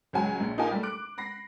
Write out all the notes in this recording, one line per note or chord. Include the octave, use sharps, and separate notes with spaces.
C#2 F#3 G#5
A#1
D#4 F4 G4 A#4 G#5
G3 A3
D6 F#6 D7
B5 A#6 C7